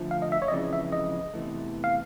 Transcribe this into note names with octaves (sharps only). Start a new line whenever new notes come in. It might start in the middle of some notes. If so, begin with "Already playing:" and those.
Already playing: D3 F3 A3
F5
D#5
E5
C#5
D#5
F2 C#3 E3 G#3 D5
E5
D#5
E2 C3 E3 A3
F5